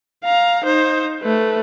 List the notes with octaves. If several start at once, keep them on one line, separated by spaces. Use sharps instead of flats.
F5 A#5
D#4 C5
A3 B4